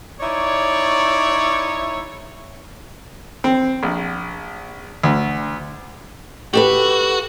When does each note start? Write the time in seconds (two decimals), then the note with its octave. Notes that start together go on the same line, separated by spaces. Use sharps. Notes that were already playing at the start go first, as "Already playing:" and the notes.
0.21 D#4 E4 C#5 D5
3.44 C4
3.83 A#1
5.03 D2
6.53 F#4 G4 A4 B4